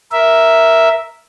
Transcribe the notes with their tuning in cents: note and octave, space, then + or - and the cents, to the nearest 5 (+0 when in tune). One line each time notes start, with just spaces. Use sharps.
A#4 +0 E5 +0